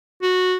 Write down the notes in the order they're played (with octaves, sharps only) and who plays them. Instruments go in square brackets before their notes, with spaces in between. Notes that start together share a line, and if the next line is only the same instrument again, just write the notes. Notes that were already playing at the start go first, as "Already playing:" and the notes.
[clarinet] F#4